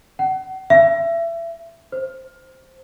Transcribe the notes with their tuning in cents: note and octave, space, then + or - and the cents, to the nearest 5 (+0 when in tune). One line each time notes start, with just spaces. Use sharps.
F#5 +35
E5 +30
C5 +0